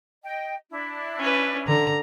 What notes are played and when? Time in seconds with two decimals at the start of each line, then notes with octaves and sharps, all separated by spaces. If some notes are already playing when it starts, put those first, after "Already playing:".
0.24 D#5 G5
0.70 D4 E4
1.19 C#4 B4
1.67 D3 A#5